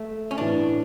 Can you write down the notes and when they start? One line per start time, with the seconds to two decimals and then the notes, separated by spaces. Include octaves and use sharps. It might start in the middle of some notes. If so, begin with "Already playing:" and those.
Already playing: A3
0.31 C#4
0.38 A2 E3 A3 D4 E4 B4